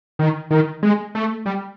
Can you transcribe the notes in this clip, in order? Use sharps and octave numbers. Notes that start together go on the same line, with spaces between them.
D#3
D#3
G#3
A3
G3